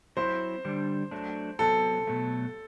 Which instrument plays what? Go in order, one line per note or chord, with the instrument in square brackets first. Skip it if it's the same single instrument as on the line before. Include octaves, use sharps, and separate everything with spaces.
[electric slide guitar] F#3 C4 E4 [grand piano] C5
[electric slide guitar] D3 G3 D4
F#3 A3 D4
[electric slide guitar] C3 F#3 B3 [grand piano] A4
[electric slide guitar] B2 F#3 A3